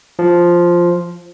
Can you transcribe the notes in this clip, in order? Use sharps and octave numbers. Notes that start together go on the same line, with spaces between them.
F3